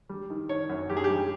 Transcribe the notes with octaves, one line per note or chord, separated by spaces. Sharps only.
G3
D#3
D#3 C#5
F#2
F#2 G4
G#4
G4
G3